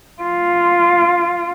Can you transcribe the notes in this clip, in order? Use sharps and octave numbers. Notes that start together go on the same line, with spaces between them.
F4